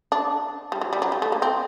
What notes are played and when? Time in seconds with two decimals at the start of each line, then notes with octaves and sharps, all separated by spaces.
0.12 D4
0.72 G3
0.81 F#3
0.93 G3
1.02 F#3
1.12 G3
1.22 A3
1.32 A#3
1.42 C4